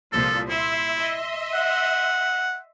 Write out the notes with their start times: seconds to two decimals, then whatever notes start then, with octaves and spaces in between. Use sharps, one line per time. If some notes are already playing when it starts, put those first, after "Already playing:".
0.12 C2 A#2 F3 A4
0.50 E4 E5 C6
0.96 D#5 E5 C6
1.54 F#5